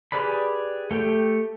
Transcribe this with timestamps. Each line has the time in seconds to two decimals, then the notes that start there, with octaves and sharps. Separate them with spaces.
0.12 G4 G#4 B4 D5 B5
0.91 A3 G4 G5